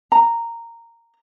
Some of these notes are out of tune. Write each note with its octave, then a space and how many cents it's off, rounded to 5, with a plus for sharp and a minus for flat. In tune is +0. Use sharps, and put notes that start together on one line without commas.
A#5 -10